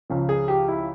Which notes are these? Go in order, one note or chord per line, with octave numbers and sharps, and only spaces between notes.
C#2 C#3 F3
G#4
G4
E4